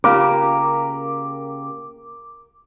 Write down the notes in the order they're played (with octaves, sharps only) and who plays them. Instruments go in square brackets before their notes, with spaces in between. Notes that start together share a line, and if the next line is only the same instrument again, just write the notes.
[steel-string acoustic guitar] C#3 A#3 G4 [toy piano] C#4 F4 F5 [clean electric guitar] A#4 [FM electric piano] D6